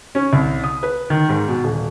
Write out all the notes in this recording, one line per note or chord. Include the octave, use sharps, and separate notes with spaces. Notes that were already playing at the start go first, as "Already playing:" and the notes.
C#4
C2
D#6
B4
D#3
G#2
B2
D#1